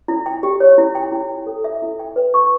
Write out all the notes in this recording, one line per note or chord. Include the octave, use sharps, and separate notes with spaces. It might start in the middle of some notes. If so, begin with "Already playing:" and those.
E4
G5
G4
C#5
E4
G5
E4
G5
A4
E5
E4
G5
B4
C#6